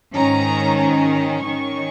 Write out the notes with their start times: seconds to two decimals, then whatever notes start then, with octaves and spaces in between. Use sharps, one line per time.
0.15 G#2 D#3 C#4 A#5
0.81 A#5
1.46 D#3 C#4 C#6